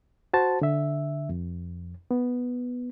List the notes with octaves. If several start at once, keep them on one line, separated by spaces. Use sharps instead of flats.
F#4 C5 A5
D3 E5
F2
B3